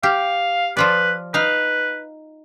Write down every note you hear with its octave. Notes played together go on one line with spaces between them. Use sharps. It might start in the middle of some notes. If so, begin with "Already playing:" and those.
G4 F5
F3 F4 B4 D5
D#4 B4 F5